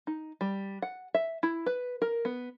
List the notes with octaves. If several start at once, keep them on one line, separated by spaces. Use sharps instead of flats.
D#4
G3
F#5
E5
E4
B4
A#4
B3